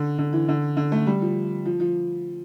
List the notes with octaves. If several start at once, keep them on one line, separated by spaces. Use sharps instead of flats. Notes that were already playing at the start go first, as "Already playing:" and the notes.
Already playing: D3
D3
E3
D3
D3
A3
G3
F3
F3
F3